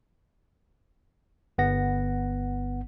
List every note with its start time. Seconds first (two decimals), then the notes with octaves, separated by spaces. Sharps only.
1.58 G1 B3 F#5 A#6